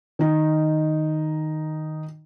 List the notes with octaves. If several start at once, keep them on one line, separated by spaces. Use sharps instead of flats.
D#3 D#4